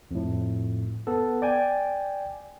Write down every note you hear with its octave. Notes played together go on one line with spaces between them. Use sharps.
F2 A2
B3 A4
D5 G5 G#5